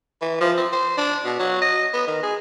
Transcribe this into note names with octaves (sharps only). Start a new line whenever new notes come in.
E3
F3
C4
C5
D4
B2
F#3
D#5
B3
D#3
G#4